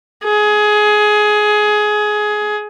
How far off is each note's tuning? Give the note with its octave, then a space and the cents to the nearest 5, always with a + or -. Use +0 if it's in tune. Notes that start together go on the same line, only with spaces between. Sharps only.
G#4 +20